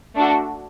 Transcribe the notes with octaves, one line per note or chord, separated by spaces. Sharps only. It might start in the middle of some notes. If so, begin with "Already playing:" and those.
A3 D4 F#4 A4